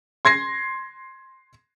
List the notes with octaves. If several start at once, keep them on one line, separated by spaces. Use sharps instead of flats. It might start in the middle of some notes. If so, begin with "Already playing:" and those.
C6 G#6 A#6 C7